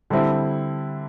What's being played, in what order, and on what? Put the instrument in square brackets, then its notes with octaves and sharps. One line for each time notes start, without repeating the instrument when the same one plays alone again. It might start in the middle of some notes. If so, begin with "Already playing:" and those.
[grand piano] D3 G3 C4 E4